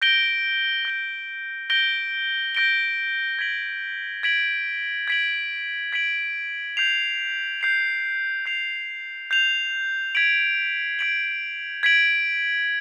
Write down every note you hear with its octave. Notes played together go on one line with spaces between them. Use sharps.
G6 A#6 D7 G7
G6 A#6 D7 G7
G6 A#6 D7 G7
G6 A#6 D7 G7
G#6 B6 D7 F#7
G#6 B6 D7 F#7
G#6 B6 D7 F#7
G#6 B6 D7 F#7
G6 C7 F7
G6 C7 F7
G6 C7 F7
G6 C7 F7
G#6 B6 D7 F#7
G#6 B6 D7 F#7
G#6 B6 D7 F#7